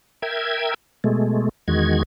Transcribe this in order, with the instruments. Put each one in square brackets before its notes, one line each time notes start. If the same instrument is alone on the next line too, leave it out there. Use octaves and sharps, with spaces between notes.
[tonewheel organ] A#4 E5 G5 G#6
B2 G#3 A3
E2 D#3 G#3 F#4 G#6